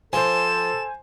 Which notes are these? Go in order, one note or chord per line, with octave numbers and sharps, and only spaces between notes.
F3 A4 C5 G#5 E7